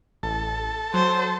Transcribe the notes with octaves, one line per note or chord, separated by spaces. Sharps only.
A1 A4 A5
F#3 C5